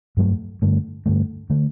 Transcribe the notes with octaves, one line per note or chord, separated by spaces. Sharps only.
G2 F#3 A3
G2 D3 A3
G2 D3 A3
D3 A3